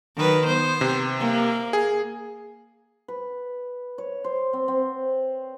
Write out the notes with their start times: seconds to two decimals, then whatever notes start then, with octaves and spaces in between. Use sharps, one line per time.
0.16 D#3 F#3 B4
0.46 B3 C5
0.81 C3
1.19 A#3
1.73 G#4
3.08 B4
3.98 C#5
4.24 C5
4.53 C4
4.68 C4